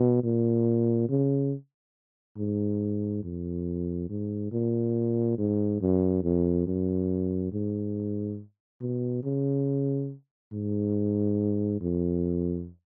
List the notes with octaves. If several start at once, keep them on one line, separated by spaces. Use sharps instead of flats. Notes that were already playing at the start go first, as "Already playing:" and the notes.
Already playing: B2
A#2
C#3
G#2
F2
G#2
A#2
G#2
F#2
F2
F#2
G#2
B2
C#3
G#2
F2